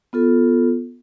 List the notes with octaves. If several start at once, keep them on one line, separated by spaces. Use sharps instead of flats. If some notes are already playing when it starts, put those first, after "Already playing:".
B3 F4 A4